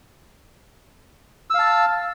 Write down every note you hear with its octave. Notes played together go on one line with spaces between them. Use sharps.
F5 A5 E6